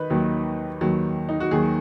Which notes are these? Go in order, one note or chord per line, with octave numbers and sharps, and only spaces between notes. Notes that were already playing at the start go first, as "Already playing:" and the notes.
Already playing: D#3 B4 D#5
D#2 D#3 F#3
D#2 D#3 F#3
D#4
F#4
D#2 D#3 F#3 G#4